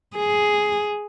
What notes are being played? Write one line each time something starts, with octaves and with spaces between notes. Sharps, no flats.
G#4